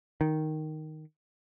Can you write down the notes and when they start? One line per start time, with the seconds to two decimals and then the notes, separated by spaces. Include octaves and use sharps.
0.21 D#3